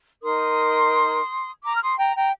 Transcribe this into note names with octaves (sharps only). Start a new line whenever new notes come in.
D#4 A#4 C6 D#6
A#5 D6
F6
C6 D#6
G5 A#5
G5 A#5